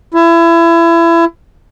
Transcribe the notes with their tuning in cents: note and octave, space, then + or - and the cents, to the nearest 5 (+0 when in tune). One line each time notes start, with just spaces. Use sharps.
E4 +30